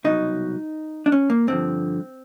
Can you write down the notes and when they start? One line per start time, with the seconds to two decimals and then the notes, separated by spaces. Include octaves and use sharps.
0.04 C2 B2 F#3 D#4
1.06 D4
1.12 C#4
1.30 A#3
1.47 G2 D3 F3 C4